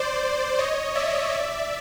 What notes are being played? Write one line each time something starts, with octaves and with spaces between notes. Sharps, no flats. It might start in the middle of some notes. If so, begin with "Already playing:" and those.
Already playing: C5 D5
C#5 D#5
D5 E5
D5 E5